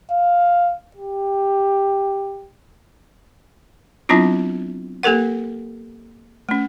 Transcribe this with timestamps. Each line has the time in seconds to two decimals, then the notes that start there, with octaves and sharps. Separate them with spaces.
0.11 F5
0.96 G4
4.09 F#3 B3 C4 D4 E4 F4
5.03 A#3 G4 A4 A#4 F#5
6.49 A3 C#4